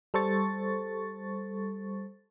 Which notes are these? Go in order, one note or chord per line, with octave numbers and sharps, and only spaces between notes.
G3 A4 C5 C#6 A6